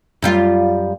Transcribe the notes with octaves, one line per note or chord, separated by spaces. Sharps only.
F#2 G3 F4